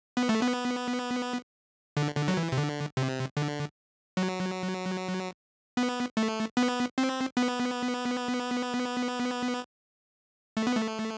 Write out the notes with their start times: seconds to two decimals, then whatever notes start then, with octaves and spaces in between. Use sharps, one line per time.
0.17 B3
0.29 A3
0.42 B3
1.97 D3
2.17 D3
2.28 F#3
2.37 E3
2.52 C3
2.58 D3
2.97 C3
3.37 D3
4.17 F#3
5.77 B3
6.17 A3
6.57 B3
6.98 C4
7.37 B3
10.57 A3
10.67 B3
10.76 A3